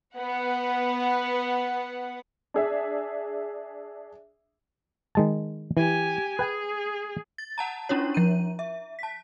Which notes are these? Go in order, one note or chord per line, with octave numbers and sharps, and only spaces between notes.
B3 F#5
D4 G#4 E5
D#3 G#3 A5
E3 G4 G#5
G#4 B4 G5 G#5
A6
F#5 A5 A#5
C#4 D4 E4 F4 C#5
F3 D#7
E5
A5 B6